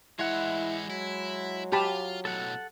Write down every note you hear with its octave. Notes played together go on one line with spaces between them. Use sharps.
E3 G#3 E4 C#5 F#5
F#3 E4
F4 G4 A5 B5
B1 A2 A4 F#5